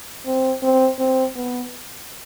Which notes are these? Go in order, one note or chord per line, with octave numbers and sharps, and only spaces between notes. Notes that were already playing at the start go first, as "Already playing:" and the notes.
C4
C4
C4
B3